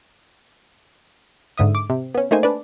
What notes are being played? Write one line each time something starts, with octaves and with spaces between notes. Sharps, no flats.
G#2 D3 E5 D#6
D6
C3
B3 C#4
A3 A#3 D#4 C5 G#5
D4 B4 D5